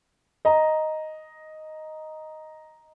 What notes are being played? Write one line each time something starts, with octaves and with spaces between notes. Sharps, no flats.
D#5 A#5